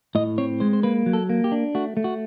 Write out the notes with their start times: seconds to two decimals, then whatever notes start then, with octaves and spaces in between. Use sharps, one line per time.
0.15 A2 D#5
0.38 C4 C#5
0.60 G#3 C5
0.73 C5
0.83 A#3 B4
1.06 F#3
1.13 A4
1.29 A#3
1.44 G4
1.52 D4
1.75 A3 F#4
1.97 A3
2.04 F#4